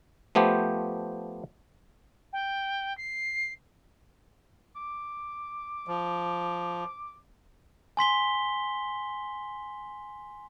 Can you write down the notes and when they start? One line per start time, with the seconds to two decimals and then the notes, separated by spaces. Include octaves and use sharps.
0.35 F3 A3 B3 G4 C5
2.33 G5
2.98 C7
4.76 D6
5.87 F3
7.97 G#5 C6 B6 G7